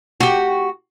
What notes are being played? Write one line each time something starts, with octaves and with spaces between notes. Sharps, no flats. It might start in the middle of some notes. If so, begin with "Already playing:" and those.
F#4 G4